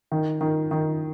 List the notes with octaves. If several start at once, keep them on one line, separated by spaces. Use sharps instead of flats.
D#3
D#3
D#3